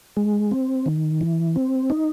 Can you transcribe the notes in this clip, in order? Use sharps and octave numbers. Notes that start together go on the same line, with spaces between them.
G#3
C4
D#3
E3
C4
D#4